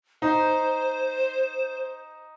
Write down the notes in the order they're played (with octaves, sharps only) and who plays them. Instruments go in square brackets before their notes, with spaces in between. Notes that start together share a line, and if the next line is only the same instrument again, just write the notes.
[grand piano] D#4 [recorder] C5